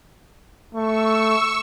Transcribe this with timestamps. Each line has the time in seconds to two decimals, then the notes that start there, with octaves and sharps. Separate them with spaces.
0.74 A3 C#6 E6